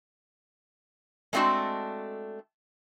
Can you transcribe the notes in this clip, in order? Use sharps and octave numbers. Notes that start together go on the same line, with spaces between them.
G#3 A3 C4 D4 F#4 A4